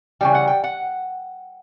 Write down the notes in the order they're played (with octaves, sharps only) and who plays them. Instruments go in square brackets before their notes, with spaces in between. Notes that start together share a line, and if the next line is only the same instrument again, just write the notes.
[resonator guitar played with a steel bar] C#3 E3 G3 G5
F#5
G5
F#5